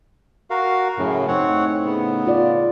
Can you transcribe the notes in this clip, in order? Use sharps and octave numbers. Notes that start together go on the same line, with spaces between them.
F#4 A#4 F5
F#2 A2 C#3
A2 C4 D#4 C#5 F#5
C#3 B3
F4 D5